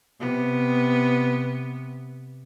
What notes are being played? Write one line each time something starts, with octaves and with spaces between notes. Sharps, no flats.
C3 B3